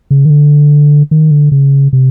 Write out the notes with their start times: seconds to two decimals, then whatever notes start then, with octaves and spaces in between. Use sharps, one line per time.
0.11 C#3
0.25 D#3
0.30 D3
1.11 D#3
1.31 D3
1.52 C#3
1.93 C3